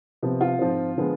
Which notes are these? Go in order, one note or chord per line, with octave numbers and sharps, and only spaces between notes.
C3 F3 B3
F4
G#2 F3 C4
D3 F3 G#3 B3